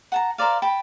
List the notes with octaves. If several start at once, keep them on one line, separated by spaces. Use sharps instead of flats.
F#5 A5 A#5
A#4 C5 D5 F5
G5 A5 B5